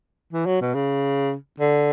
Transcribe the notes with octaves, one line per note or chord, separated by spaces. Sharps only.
E3
F#3
B2
C#3
D3